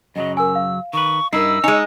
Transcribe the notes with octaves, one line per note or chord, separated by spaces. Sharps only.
F#2 C#3 F#3 D#5
A#4 G#5 E6
F5
D#3 B4 C#6
G2 D#4 E4 A#4 E6 C7
G#3 D#4 C#5 G#5